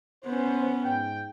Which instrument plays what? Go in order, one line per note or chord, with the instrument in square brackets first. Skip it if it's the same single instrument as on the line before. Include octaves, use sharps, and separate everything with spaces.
[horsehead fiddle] B3 C#4 [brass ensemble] C5
[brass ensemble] G#2 G5